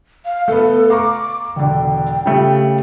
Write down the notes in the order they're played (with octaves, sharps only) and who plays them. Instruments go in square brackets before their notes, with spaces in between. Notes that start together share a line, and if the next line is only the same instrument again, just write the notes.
[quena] F5
[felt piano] A3 B3 [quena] A4
[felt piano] F5 A#5 C#6 [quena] D6
[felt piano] E1 D3 [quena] G5
[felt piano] C#3 G3 A3